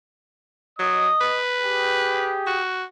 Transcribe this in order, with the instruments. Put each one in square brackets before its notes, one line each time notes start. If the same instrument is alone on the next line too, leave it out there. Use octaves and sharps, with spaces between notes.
[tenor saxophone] F#3 [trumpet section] D#5 D#6
[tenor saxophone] B4
[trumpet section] G4 G#4
[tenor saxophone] F#4